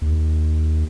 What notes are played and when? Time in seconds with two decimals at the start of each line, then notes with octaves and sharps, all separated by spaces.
0.02 D#2